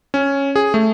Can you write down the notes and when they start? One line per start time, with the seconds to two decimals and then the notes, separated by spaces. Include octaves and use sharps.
0.14 C#4
0.56 G#4
0.74 A3